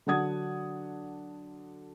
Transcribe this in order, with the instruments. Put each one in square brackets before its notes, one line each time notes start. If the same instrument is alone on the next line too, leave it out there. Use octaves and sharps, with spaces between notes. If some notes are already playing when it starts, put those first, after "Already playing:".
[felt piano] D3 F#3 D4 F#5 D#6 G#6